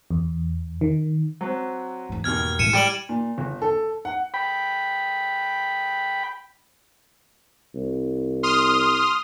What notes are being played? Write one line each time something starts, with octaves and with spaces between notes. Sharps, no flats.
E2
D#3
F#3 C4
E2 G#2
D#2 B2 F6 G#6
A2 E3 G#3 C#7 D#7 E7
G3 F6 D7 F#7
A#2
G1
A4
F#5
G5 B5
C2
C6 D#6 F6